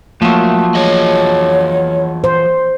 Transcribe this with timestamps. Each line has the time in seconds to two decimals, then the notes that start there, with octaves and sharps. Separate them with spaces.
0.22 F3 F#3 A3 A#3
0.75 E3 G#4 C#5 D#5
2.24 C5